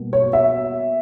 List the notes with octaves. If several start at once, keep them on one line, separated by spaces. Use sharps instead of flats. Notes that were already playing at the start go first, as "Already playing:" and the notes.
Already playing: B2 G3 A#3
C#5
E5